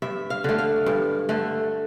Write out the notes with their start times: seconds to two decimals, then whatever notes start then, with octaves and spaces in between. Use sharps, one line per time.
0.02 G2 E5
0.30 F5
0.44 D3 A3
0.58 F5
0.86 G2
1.29 D3 A3